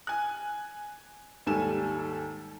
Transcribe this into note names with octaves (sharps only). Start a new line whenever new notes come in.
G#5 F#6
D#2 G#2 G3 A4 G#5 E7